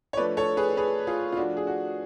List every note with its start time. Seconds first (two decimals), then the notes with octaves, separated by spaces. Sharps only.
0.13 C#5
0.17 F3 A3 D4 B4 D5
0.37 A4 C#5
0.57 G#4 B4
0.77 G#4 B4
1.07 F4 G#4
1.32 F4
1.37 F3 A3 D4 F#4
1.57 G#4
1.67 F#4